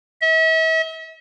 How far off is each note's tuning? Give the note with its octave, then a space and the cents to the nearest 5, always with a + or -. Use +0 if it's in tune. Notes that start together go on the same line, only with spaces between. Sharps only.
E5 -40